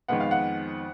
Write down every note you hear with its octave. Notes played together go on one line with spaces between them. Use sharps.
F2 D#3 G#3 B3 F#5
F5
F#5